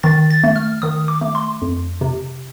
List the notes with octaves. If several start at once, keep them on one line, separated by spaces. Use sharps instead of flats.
D#3 A6
A6
A3
F6
D#3 D#6
D6
A3
C6
F2
C3